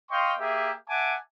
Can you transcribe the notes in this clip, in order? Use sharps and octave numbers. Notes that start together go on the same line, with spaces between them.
D#5 F5 G5 C6 C#6
A#3 G4 G#4 E5
E5 F#5 G#5 A5 D6